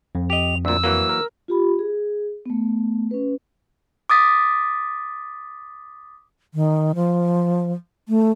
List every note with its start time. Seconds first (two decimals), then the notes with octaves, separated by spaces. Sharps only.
0.15 F2
0.30 G4 D#5 F7
0.65 D2 A#2 E6
0.84 E3 F#3 A#3
1.09 A#4
1.48 F4 G4 B5
1.79 G#4
2.46 A3 B3
3.11 C#4 B4
4.10 D6 D#6 A6 B6
6.54 D#3
6.95 F3
8.09 A3